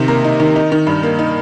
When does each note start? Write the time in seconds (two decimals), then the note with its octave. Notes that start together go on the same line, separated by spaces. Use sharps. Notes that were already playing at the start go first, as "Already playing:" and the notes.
Already playing: C3 D#3 D#4
0.08 A#3 A#4
0.24 D#4
0.40 D#3
0.56 D#4
0.72 D#3
0.87 G2
1.03 A#3
1.19 D#4